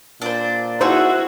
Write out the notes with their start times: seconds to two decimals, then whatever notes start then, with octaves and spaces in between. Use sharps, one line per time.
0.22 A#2 D4 C5
0.81 D#4 E4 F#4 G#4 C5 E5